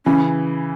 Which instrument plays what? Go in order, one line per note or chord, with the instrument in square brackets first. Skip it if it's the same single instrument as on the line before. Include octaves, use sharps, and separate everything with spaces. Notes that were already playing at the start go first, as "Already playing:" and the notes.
[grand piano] C#3 E3 [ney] C#4